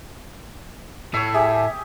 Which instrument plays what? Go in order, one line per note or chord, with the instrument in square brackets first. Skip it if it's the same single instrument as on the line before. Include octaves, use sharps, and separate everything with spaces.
[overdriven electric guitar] A2 [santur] C#5 E5
[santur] G4 G#4 [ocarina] E5